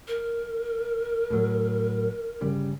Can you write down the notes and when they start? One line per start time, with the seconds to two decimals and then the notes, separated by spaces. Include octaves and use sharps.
0.08 A#4
1.30 A2 F#3
2.41 G1 C#3 G3